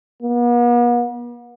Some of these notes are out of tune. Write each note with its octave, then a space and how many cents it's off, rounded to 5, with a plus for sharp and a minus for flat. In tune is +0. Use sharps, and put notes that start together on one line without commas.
B3 -45